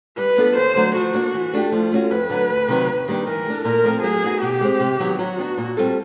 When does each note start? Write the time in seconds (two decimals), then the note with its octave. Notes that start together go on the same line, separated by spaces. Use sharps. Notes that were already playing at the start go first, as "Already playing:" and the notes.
0.18 G3 B4
0.38 B3 D4 F4 A4
0.57 D#2 C5
0.76 D3 F#3 A3
0.96 F3 F#4
1.14 A#3 D4
1.34 E3
1.53 A3 D4 G4
1.72 F3 F4
1.92 A3 C#4 F#4
2.11 F2 B4
2.30 D3 F#3
2.49 D2
2.68 C3 D#3 F#3
2.87 D#2
3.08 D#3 G3 A#3 D4
3.27 E3 A#4
3.46 A3 D4
3.65 A#2 A#4
3.84 F3 A3 C4 F4
4.03 F#3 G#4
4.22 B3 D#4 F#4
4.42 B2 G4
4.61 G#3 C4
4.80 C3
5.00 D#3 F#3 B3
5.19 F#3 F#4
5.39 B3 D4
5.58 A#2
5.77 G3 C4 F4 A4